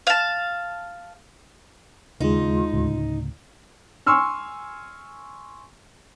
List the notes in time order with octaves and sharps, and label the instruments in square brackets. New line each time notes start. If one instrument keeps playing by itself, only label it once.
[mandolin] F5 A5
[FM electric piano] D#2 G#3 [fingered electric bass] C#3 [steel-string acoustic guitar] D#4 [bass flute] F4
[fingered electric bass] D2 A2 C#3
[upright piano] G#5 C6 C#6 E6 F6